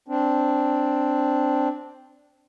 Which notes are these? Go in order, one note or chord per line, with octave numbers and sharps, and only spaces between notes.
C4 D4